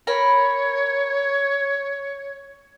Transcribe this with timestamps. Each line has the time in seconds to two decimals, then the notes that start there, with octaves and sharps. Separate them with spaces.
0.07 A#4 C#5 B5